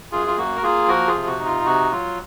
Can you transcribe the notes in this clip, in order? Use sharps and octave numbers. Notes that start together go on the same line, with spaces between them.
F#2 F4 G#4
F4
A#3 F#4
A#4
A#3 F4 G#4
F3 F#4 A#4
F4 G#4
C3
F#4
D#4
F4
C3 F#4
F#3 F4